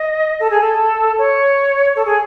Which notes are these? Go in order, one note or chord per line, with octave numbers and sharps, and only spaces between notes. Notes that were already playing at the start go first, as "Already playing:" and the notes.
Already playing: D#5
A4
G#4
A4
C#5
A4
G#4